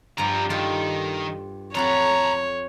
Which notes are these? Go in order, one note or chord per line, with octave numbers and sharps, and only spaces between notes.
G2 F3 G3 A#5
D#3 F4 G4 A4
F2 A4 C#5 F#5 A#5 B5